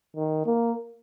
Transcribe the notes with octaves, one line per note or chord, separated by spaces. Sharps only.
D#3
A#3